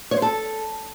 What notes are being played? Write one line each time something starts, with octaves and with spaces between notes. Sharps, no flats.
C#5
C5
A4